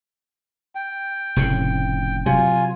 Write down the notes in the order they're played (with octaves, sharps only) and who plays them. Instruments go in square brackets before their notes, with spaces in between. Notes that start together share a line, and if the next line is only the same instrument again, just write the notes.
[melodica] G5
[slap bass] F1 A2 C#3
[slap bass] C3 F#3 [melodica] F4 G#5